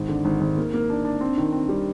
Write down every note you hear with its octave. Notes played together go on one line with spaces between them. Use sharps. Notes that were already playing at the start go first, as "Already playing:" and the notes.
Already playing: G#1
D3
G#1
G#1
A#3
A#3
D4
D4
C4
D#3
C4
G3